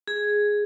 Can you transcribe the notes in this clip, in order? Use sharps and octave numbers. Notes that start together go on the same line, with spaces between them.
G#4